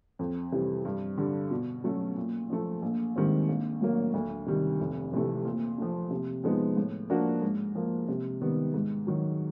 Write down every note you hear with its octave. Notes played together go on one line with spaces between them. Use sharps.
F2
C3 E3 G3
G2
D3 G3
B2
F#3 A3 C#4
A#2
F3 A3
A#1
G#2 D#3 G3 C4
A#1
A2 F#3 A#3
D2
C3 D#3 G3
F1
F2 C3 E3 A3
A#2
F3 A3
C3
F3 G#3 B3 D#4
A2
F3 A#3 D4 F#4
G#2
F3 A#3
C3
D#3 G3 B3
G#2
D#3 F#3